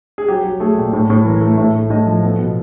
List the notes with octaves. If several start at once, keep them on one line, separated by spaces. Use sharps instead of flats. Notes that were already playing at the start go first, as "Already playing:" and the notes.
G#4
F#3 G4
F#3
A3 G#4
A#2
A2
A2
E3 A#4
A3
A2 E5
A3
A2 D#5
F3
B3 A4
B2